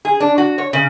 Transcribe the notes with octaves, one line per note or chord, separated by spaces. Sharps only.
G#4
D4
F#4
C#5
C#3